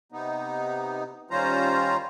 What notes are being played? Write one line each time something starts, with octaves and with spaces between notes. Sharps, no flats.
C3 B3 D#4
D#3 G3 C#4 F4 C5 A#5